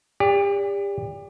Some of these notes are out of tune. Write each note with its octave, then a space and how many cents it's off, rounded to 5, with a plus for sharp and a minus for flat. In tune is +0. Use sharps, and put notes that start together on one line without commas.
G4 +35 D5 -25